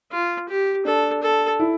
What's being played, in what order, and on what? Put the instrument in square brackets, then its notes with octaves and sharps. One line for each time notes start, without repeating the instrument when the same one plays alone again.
[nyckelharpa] F4
G4
[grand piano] D4 [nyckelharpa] A4
[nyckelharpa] A4
[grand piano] E4